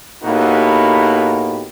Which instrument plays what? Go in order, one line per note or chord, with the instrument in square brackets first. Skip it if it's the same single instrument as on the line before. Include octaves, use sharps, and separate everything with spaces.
[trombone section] A2 A#3 B3 D#4 F#4 G4